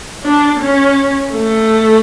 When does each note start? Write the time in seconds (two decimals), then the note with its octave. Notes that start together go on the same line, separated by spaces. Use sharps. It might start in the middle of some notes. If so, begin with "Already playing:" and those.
0.24 D4
0.60 C#4
1.32 A3